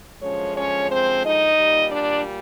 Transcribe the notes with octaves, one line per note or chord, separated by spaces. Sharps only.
F#2 D3 F3 G#3 C#4 C#5
C#4 C#5
C4 C5
D#4 D#5
A#2 G3
D4 D5